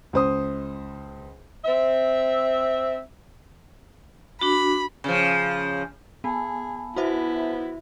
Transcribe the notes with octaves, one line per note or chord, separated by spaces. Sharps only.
C#2 C5 D#6
C4 E5
D4 F#4 B5
C#3 F3
B3 G#4 G#5 A5 B5
B3 E4 F#4 C5 E5